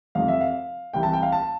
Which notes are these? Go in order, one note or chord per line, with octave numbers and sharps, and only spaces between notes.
F2 C3 F3 F5
E5
F5
C2 C3 E3 G5
A5
G5
F5
A5